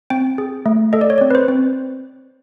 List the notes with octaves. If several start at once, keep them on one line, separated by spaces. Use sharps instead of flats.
C4 G5
G#4
A3
A4 D#5
D5
C#5
D5
C4
B4
C5
C4